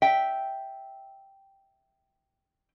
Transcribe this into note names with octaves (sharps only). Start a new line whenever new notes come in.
E5 G5